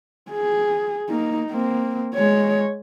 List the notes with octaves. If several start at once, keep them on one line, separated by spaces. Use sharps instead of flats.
G#4
A#3 D#4
A#3 C4
G#3 C#5